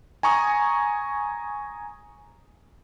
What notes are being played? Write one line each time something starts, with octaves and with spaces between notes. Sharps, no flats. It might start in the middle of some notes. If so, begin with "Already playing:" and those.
G#5 A#5 C#6 D#6